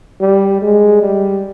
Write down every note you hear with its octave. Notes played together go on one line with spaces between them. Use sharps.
G3
G#3
G3